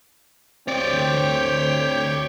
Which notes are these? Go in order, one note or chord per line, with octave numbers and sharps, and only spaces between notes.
D2 C4 G4 C#5 D5 G5